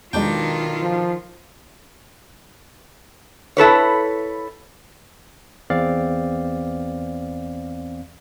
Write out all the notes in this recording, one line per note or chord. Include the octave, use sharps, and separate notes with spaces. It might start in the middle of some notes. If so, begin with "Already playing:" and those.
B1 E2 D#3 G#3 D4 F4 G5
F3
E4 A4 B4 C#5
E2 C4 D5 F5